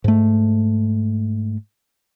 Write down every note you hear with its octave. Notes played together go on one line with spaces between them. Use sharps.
G#2 A3